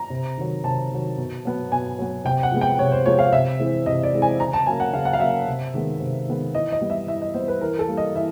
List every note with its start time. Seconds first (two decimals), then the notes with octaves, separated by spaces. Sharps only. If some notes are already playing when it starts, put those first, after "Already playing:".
Already playing: A#5
0.10 C3
0.37 D#3 F#3
0.64 C3 A5
0.91 D#3 F#3
1.17 B2
1.45 F#3 B3
1.72 B2 G#5
1.99 F#3 B3
2.25 C3 G5
2.43 F#5
2.52 F3 G#3 B3
2.61 G5
2.79 C3 C#5
2.92 C5
3.06 F3 G#3 B3 C#5
3.19 F5
3.32 C3 E5
3.59 E3 G#3 C4
3.86 C3 D#5
4.03 D5
4.13 E3 G#3 C4
4.22 G#5
4.39 C#3 A#5
4.53 A5
4.66 F#3 A#3 C#4 G#5
4.80 F#5
4.93 C#3 F5
5.05 F#5
5.13 F5
5.20 F#3 A#3 C#4 E5
5.47 C3
5.74 D#3 G#3 B3
6.00 C3
6.27 D#3 G#3 B3
6.54 E3 D#5
6.72 D#5
6.81 G3 B3
6.90 E5
7.07 E3 E5
7.22 D#5
7.34 G3 B3 C5
7.48 B4
7.61 E3 A#4
7.79 A4
7.88 G3 A#3
7.97 D#5
8.15 E3 E5